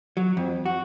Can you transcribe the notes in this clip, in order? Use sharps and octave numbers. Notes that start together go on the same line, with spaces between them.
F#3
F2
F#4